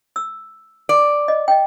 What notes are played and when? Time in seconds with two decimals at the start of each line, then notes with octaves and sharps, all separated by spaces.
0.16 E6
0.89 D5
1.28 D#5
1.48 D#5 G5